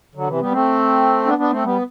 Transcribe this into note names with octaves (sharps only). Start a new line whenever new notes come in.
D3 F#3
C3 E3
G3 B3
A3 C4
B3 D4
B3 D4
A3 C4
G3 B3